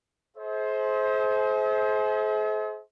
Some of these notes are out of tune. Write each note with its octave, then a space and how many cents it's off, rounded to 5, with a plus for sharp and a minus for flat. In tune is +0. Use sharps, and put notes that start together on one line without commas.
G#4 +45 C5 +5 E5 -45